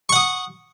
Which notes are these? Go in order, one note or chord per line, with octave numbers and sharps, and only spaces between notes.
F#5 C#6 D#6